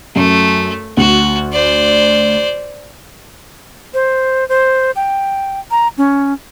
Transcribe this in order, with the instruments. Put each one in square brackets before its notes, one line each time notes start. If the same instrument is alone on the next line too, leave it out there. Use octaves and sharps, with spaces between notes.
[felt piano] F#2 [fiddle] A3
[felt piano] D2 [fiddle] F#4
[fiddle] C5 D5
[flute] C5
C5
G5
A#5
C#4